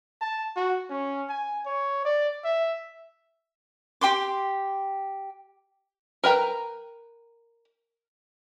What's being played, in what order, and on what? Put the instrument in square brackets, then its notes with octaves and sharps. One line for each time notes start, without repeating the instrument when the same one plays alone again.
[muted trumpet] A5
F#4
C#4
G#5
C#5
D5
E5
[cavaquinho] G4 G5 C6 D6
[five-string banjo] A#4 B4 G5 A#5